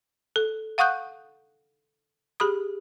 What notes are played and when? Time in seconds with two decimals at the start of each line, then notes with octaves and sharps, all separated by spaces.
0.36 A4
0.78 F5 F#5 C#6 D#6 F#6 G6
2.40 G4 G#4 B5 D#6